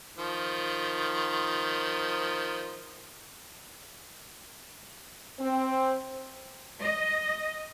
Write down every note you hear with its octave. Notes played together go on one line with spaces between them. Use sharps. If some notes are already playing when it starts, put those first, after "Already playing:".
D#3 F3
C4
D#5